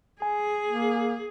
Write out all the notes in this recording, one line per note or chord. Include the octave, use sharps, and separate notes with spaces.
G#4 G#5
A#3